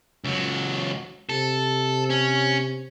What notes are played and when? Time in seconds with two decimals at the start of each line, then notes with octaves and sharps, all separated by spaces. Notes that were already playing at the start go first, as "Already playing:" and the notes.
0.24 C#2 F#3
1.29 C3 A4
2.10 C#4